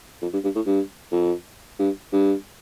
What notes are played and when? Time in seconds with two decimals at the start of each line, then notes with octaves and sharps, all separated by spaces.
0.22 F2
0.33 G2
0.44 G2
0.56 A2
0.67 G2
1.12 F2
1.79 G2
2.13 G2